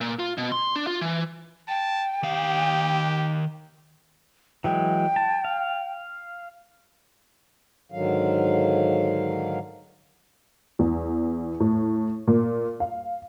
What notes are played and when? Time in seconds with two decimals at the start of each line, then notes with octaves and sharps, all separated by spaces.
0.01 A#2
0.19 F4
0.38 B2
0.52 C6
0.76 D4
0.87 F4
1.01 E3
1.68 G5 A5
2.23 D#3 G4 F5
4.64 E3 F#3 G#3 G5
5.16 A5
5.45 F5
7.92 G#2 D3 D#3 F#3 F5
10.79 E2
11.60 A2
12.27 A#2
12.80 F5